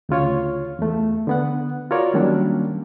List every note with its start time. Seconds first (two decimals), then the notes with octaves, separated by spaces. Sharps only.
0.09 D2 C#3 F4 C#5
0.79 E2 A3
1.27 D3 B3 F#5
1.91 F4 F#4 A#4 C#5 D5
2.14 D#3 F#3 G3 A#3 C#4 D4